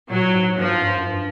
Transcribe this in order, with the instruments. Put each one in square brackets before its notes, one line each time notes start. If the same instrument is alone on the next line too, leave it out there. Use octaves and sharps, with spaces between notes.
[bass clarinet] A#2 [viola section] F#3
[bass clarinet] A#2
A2
G#2
G#2
[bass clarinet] G2 [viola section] F3
[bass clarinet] G#2
G2
F#2
G2